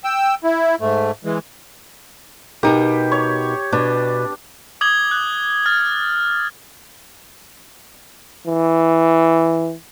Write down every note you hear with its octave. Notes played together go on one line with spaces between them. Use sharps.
G5 E6
E4
G#2 A3
E3 G#3
B2 D#4 G4 A#4
C#5
B2 D4
D6 D#6 G#6 F#7 G7
F#6
F6 A6
E3